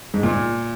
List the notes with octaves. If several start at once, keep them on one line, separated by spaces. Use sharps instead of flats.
G#2
A#2